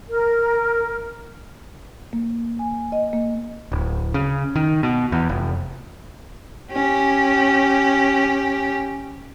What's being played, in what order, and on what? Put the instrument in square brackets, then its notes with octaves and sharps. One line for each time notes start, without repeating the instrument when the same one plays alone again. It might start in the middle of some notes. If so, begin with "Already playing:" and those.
[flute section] A#4
[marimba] A#3
G#5
D#5
A#3
[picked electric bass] D1
C#3
D#3
B2
E2
F1
[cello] C#4 G4